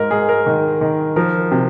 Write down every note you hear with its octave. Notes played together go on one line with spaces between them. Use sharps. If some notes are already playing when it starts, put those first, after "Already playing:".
Already playing: G#2 A#4
G#2 G#4
A#4
D#3
D#3
F3 A#4
C3